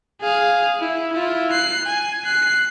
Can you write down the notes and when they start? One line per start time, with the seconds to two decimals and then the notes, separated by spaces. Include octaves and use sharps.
0.21 G#4 F5
0.80 E4
1.13 E4 F4
1.51 F#6 C7
1.85 G#5
2.25 F#6 C7